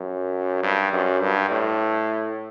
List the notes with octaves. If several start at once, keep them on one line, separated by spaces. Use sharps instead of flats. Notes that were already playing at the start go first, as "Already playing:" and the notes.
Already playing: F#2
G2
F#2
G2
A2